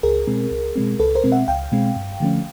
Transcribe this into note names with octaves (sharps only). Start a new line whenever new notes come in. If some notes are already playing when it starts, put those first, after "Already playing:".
C#2 G#4 A#4
B2 G#3 C4
C#2
B2 G#3 C4
C#2 A4 B4
A#4 C5
B2 G#3 C4
E5 F#5
C#2 F5 G5
B2 G#3 C4
G2
D3 F3 A3 C#4